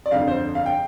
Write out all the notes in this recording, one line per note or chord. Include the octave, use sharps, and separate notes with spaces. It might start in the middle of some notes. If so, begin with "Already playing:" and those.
D5
G1 F2 D3 F5
C5
F5
G5